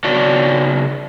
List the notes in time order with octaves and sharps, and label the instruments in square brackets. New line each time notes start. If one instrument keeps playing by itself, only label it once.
[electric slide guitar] C#3 B3 F#4 C#5 D5 A5